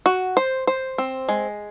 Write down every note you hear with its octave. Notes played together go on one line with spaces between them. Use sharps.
F#4
C5
C5
C4
G#3